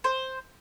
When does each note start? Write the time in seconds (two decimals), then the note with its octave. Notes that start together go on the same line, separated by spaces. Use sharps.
0.04 C5